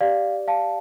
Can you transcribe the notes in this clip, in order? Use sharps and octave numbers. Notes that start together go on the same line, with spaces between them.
G4 D5 F5
F5 A5